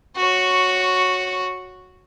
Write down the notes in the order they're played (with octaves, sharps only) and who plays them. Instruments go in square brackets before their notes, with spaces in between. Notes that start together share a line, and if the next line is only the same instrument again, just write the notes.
[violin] F#4 C#5